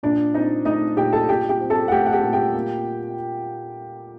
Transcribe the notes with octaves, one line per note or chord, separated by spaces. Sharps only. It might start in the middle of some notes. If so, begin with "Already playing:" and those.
A#2 D4 D5
C4 D#4 D#5
A3 D#4 D#5
A#2 G4 G5
A4 A5
A#2 G4 G5
G4 G5
C4
A4 A5
F#5
A3 G4 G5
F#5
G4 G5
A#2
G4 G5
A#3